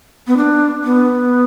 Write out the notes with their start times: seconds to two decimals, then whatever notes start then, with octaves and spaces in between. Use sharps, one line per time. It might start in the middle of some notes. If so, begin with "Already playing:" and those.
0.27 B3
0.37 D4
0.84 B3